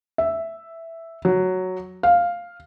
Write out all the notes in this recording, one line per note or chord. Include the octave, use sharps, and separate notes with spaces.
E5
F#3
F5